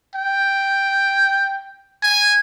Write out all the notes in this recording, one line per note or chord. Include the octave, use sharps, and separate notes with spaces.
G5
G#5